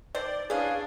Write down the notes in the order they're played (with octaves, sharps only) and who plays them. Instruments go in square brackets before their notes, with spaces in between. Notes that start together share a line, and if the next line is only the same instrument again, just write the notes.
[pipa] D#3 A4 C5 [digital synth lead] D5
[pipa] E3 C#4 [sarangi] D4 [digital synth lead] G#4 [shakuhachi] F5